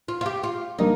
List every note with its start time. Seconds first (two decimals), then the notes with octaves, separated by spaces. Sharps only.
0.08 F4
0.21 F4
0.26 G4
0.43 F4
0.79 G3 A#3 D4 D#4